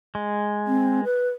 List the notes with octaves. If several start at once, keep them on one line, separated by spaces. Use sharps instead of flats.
G#3
C4
B4